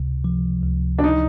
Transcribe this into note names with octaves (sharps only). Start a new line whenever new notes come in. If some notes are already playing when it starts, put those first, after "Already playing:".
Already playing: C#2 C3
F3
C#2
D4
D#4